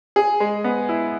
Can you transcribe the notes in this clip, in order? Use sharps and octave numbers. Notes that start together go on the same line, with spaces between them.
G#4
G#3
B3
E4